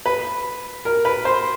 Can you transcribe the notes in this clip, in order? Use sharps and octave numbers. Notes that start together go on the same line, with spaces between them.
B4
A#4
B4
C5